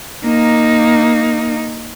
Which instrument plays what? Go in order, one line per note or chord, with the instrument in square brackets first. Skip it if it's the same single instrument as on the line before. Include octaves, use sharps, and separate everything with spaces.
[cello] A#3 D#4